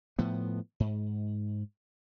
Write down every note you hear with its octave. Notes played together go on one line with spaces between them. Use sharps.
A2 F3 B3
G#2